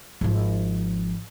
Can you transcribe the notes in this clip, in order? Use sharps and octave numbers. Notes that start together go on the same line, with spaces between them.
G#1 F3